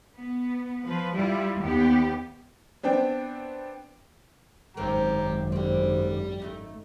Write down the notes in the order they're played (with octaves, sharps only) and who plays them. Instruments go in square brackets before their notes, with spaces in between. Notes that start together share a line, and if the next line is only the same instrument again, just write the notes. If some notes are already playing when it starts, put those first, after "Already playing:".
[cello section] B3
F3 B4
G3 E4 F4
D#2 B3 G4
[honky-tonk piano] B3 C4 D4 G5
[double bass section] G#1 F#2 [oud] C4 A#4 [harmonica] G4 A#5
[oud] D3 C4 [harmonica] G3
[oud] A3 D#4 E4